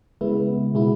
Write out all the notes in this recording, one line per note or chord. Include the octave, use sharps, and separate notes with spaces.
C#3 G#3 B3 E4
B2 G#3 B3 E4